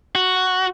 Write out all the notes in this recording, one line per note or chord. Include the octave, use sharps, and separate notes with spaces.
F#4